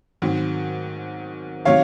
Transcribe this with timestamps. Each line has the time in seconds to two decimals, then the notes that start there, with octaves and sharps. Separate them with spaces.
0.22 G#2 D#3 F#3 C4
1.65 C3 D#3 F#3 C#5 F5